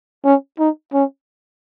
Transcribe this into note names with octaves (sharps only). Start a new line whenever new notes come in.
C#4
D#4
C#4